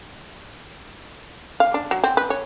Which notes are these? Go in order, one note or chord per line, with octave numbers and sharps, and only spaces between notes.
F5
D4
F#3
C4
B4
C#5